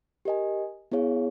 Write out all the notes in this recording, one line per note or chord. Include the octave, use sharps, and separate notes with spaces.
G4 A#4 D#5 G#5
B3 E4 G#4 C#5 F5